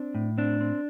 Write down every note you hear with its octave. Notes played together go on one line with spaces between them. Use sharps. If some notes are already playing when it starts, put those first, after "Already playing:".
Already playing: C4 D4
A2
C4 D4
C4